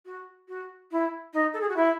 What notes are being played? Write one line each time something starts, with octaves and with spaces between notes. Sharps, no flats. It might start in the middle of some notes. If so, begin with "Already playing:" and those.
F#4
F#4
E4
D#4
A4
G#4
F#4
E4